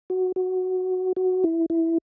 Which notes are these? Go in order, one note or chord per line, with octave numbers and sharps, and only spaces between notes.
F#4
F#4
F#4
E4
E4